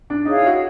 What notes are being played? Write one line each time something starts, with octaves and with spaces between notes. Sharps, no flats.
D4
D#4 G#4 C#5 F5
E4
F#4